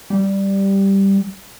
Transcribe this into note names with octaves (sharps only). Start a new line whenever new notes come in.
G3